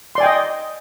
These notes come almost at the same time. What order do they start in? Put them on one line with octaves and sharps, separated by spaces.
C6 D5 G#5 G5 D#5